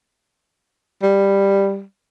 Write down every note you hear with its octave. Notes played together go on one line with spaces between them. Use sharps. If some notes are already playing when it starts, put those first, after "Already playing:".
G3